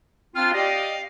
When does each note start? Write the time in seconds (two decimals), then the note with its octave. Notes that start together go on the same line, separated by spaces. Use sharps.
0.35 C4 D4 F4 F6
0.53 G4 D5 D#5 F5